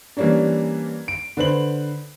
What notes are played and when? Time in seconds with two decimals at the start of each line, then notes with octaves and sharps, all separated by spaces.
0.17 E3 G3 A#3 C#4 D4
1.08 D7
1.37 D3 B4 C5 F#7